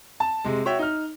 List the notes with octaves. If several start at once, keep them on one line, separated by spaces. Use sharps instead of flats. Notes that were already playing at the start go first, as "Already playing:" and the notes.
A5
C3 G#3
F#4 C#5 E5 G5
D#4 F6